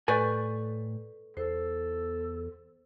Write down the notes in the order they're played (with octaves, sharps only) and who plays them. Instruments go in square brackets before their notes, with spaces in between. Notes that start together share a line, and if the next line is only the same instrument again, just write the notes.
[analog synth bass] A2 [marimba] A4 C#6 G6 [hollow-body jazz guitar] B4 D5 G#5
[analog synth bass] E2 [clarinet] A4 [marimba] C5